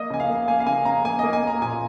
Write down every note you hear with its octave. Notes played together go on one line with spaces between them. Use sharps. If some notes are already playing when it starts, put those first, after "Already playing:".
Already playing: A#3 D#5
C#3 G#5
F5
A#3
A#3 G#5
F5
C#3 G#5
C#3 A#5
A#3 G#5
A#3 D#5
G#5
A#3 A#5
A#2 G#5